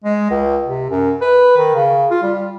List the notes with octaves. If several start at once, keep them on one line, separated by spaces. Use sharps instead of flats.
G#3
C#2
C3
F#2
B4
D#3
C#3
F4
G3